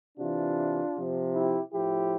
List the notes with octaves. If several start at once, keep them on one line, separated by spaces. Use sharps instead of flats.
C3 E3 D4 F4
C3 F3
E4 G4
A2 F3 E4 G4